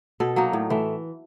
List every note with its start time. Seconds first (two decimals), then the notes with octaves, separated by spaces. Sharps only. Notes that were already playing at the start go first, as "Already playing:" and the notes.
0.20 B2 A4
0.36 F#3 A#3 D#4
0.53 A2
0.70 E3 A3